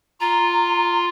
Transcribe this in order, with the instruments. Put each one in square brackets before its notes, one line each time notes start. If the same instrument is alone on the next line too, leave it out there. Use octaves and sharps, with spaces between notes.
[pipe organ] F4 [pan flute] A#5